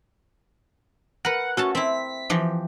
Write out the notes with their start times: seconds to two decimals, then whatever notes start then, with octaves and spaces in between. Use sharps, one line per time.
1.25 A#4 B4 F#5
1.57 C#4 F#4 A4 A5
1.75 C4 E4 B6
2.30 E3 F3 G4